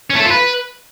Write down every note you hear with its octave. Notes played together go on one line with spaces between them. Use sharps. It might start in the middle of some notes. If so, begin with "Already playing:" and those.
C#4
A3
A4
F4
B4